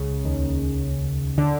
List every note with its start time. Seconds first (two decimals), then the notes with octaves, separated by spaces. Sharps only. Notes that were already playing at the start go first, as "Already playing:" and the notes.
Already playing: C#2 C#3
0.25 D#2 D#3
1.38 D3